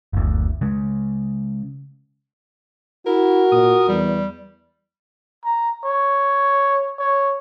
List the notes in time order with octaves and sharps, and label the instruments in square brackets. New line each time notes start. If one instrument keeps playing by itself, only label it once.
[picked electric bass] F#1 D2
C#3 G#3
[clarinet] E4 [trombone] F#4 [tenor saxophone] A#4
[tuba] A#2 [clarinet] D#6
[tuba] E2 [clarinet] G3
[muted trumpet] A#5
C#5
C#5